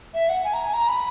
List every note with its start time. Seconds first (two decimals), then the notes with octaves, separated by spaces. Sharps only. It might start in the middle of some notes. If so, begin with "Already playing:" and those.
0.14 E5
0.29 F#5
0.44 G#5
0.54 A#5
0.64 G#5
0.73 A#5
0.88 B5